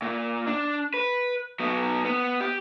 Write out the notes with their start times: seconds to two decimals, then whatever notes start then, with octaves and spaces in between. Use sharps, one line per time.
0.02 A#2
0.47 D4
0.94 B4
1.60 F#3 B3
2.05 B3
2.40 G4